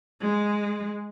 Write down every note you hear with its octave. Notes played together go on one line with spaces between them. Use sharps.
G#3